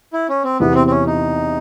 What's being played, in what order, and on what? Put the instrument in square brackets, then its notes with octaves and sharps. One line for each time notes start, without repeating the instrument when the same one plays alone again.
[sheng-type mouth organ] E4
C#4
C4
[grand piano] E2 C3 E3 [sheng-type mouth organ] B3
[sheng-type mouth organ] C4
C4
C#4
D#4